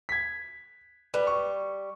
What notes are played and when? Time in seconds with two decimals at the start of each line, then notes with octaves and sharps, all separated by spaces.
0.09 G#6 B6
1.14 G3 B4
1.27 C#6